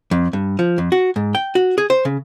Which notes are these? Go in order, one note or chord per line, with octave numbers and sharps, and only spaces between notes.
F2
G2
F3
F2
F#4
G#2
G5
F#4
G#4
C5
C#3